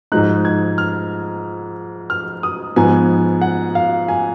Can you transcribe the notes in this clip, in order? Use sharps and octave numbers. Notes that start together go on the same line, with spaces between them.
G#2 F3 G#3 D#4 F#6
G#6
F6
F6
D#6
G#2 F3 B3 G#5
F#5
F5
G#5